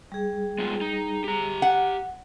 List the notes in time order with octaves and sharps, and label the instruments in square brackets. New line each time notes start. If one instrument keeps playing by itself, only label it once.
[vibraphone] G3 G#4
[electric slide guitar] G#3 B3 F4
D#4
G4 A#5
[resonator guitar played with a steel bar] F#5